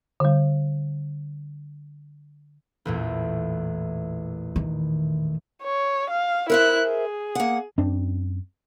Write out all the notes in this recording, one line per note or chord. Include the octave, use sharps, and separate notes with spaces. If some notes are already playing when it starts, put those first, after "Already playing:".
D3 G3
A1 E2 A#2
D#3
C#5
F5
E4 A#4 C5 E5 F#6
G#4
A#3 F#5
F#2 C4 D4